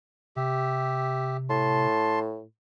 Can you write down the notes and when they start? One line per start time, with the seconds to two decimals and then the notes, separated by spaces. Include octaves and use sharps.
0.36 C3 G4 E5
1.50 A2 A5 C6